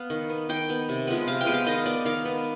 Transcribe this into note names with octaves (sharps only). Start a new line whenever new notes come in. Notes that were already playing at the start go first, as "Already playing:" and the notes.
Already playing: B3 F5
D#3
B3
D#3 G5
B3
C3
F3 G#3 B3
C3 F5
G5
F3 G#3 B3
F5
D#3 D#5
B3 D5
D#3 F5
B3